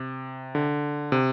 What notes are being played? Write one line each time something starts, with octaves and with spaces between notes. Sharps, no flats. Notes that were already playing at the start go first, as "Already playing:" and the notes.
Already playing: C3
D3
C3